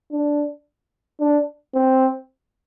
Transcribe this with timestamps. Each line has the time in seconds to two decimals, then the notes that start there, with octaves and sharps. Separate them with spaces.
0.12 D4
1.20 D4
1.75 C4